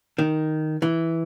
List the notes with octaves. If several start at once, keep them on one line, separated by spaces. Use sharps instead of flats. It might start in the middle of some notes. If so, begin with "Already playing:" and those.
D#3
E3